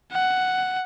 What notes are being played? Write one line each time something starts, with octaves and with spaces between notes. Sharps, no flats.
F#5